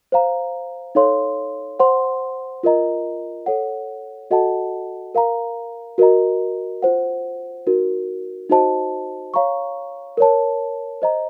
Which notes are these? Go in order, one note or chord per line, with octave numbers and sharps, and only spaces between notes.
C5 F5 A#5
D#4 A4 C#5 F5 C6
C5 F#5 C6
F4 A#4 D#5 A#5
A4 C#5 F#5
F#4 A4 D#5 F#5 A5
A#4 F5 A#5
F#4 A#4 D#5 A#5
F4 C5 F#5
D#4 F#4 A#4
D#4 F#4 C5 D#5 A5
C#5 F5 A#5 C#6
A#4 C#5 A5
C5 D#5 A#5